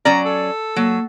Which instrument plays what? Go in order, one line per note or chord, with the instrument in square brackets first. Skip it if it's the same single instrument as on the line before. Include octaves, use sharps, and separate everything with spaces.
[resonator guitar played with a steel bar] F#3 C#4 D5 [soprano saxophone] A#5
[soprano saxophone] A4
[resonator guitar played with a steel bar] F#3 [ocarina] A#3